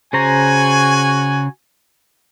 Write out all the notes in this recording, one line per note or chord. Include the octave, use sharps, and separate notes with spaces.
C#3 F#4 C5 G#5 A#5